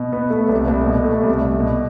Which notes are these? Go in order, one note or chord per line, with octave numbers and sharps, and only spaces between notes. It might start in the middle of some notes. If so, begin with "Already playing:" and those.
Already playing: B2
B3
A3
C2
C2
B2
A3
C2
C2
B2